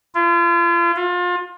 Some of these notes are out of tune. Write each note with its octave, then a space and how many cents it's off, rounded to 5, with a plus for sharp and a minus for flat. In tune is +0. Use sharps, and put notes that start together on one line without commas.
F4 -40
F4 +30